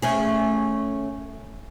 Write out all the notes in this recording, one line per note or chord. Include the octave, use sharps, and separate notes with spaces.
A3 C#4 G#4